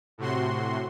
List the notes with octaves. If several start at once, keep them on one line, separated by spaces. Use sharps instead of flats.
A2 C3 F#4 C6